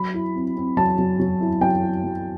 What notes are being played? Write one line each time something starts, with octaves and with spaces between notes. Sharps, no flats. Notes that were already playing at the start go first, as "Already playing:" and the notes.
Already playing: F#3 B5
E4
C4
C4
F#3 A5
F#3
F#3
E4
F#3 G5
E4
F#3